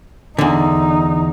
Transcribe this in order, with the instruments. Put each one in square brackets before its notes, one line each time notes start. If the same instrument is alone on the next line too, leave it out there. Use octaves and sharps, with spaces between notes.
[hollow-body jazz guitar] E2 D3 [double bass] D#4